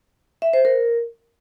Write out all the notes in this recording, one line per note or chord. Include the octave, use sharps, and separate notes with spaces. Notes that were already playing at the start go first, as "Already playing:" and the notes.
E5
C5
A#4